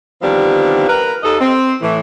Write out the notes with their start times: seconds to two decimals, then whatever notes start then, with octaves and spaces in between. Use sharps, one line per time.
0.22 D3 D#3 F3 G3 B3 C4
0.89 A#4 B4
1.23 D#2 A4 D#5
1.40 C4
1.81 A2 E3